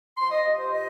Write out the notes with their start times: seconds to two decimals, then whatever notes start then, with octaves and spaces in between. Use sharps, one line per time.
0.17 F3 C6
0.30 D#5
0.45 C3
0.57 C5
0.71 D#5